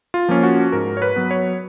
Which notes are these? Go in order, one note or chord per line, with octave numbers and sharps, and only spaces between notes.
F4
F3 A#3 C#4
F#4
G#2 A#4
C#5
B4
F#3 B3
C#5